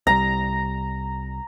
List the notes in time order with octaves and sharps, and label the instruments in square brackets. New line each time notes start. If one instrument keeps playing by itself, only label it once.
[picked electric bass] C2 G3 [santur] A#5